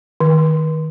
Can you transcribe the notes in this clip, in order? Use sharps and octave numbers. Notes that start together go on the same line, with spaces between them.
D#3